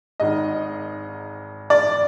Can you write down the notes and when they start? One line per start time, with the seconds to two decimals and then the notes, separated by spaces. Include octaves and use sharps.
0.20 G#1 G#2 D#3 D#5
1.70 D5